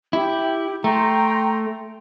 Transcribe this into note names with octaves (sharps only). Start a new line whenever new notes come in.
E4 G4
A3 G5 A#5 C6